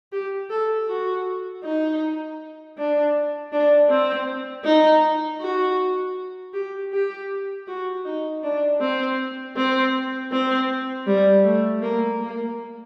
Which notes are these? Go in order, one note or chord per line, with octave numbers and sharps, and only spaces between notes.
G4
A4
F#4
D#4
D4
D4
C4
D#4
F#4
G4
G4
F#4
D#4
D4
C4
C4
C4
G3
A3
A#3
A#3